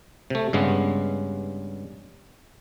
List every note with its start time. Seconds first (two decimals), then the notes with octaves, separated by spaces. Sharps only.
0.30 C3 A3
0.53 G2 C#3 G#3 B3